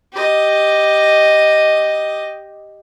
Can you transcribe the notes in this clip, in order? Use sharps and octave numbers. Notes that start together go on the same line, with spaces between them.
G4 D#5